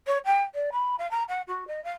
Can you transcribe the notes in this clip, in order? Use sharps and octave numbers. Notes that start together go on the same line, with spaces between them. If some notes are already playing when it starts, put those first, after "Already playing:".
C#5
G5
D5
B5
F5
A#5
F#5
F#4
D#5
F5